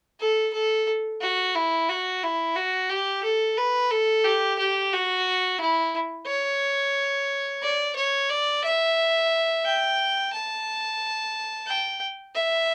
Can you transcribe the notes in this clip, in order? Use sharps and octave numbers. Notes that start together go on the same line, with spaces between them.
A4
A4
F#4
E4
F#4
E4
F#4
G4
A4
B4
A4
G4
G4
F#4
E4
C#5
D5
C#5
D5
E5
G5
A5
G5
E5